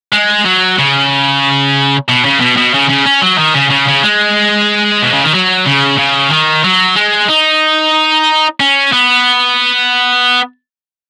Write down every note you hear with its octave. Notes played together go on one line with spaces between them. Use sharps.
G#3
F#3
C#3
B2
C#3
B2
B2
C#3
C#3
C#4
F#3
D#3
C#3
C#3
C#3
G#3
B2
C#3
D#3
F#3
C#3
C#3
D#3
F#3
G#3
D#4
C#4
B3